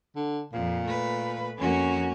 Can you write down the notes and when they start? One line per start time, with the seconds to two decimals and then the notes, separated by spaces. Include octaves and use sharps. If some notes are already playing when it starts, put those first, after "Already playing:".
0.16 D3
0.53 F2 A#2
0.86 A3 B4
1.58 F2 A#3 C#4 F#4